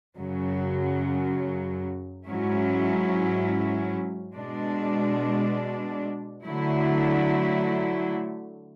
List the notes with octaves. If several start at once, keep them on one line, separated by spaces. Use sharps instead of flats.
F#2 C#3 F#3
G#2 F#3 C#4 E4
B2 G#3 D4
D3 F#3 A3 E4